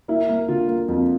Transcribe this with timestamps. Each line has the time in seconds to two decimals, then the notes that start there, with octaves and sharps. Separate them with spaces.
0.08 A#3 E4
0.29 A#3
0.48 D3 F4
0.68 A#3
0.88 F2 F4